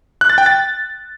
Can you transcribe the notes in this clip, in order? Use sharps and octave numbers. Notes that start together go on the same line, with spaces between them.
F#6
A6
G5
A6